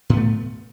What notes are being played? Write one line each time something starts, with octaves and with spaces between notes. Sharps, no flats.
A2 A3 B3